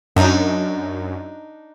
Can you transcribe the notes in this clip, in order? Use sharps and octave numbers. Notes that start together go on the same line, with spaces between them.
F#2 D4 D#4